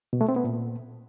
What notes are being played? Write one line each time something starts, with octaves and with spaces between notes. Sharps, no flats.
B2
A3
C4
B3
A#2